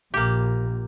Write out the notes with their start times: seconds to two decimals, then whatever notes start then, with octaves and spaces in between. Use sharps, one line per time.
0.14 A#1 A#2 A#3 G4